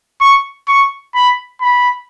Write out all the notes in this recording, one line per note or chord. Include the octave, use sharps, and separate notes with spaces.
C#6
C#6
B5
B5